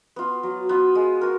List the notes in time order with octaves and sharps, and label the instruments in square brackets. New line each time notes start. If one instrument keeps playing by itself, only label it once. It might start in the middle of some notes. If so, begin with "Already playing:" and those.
[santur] B3 F4
F#3
B3 F4
G#3
F#4 A#4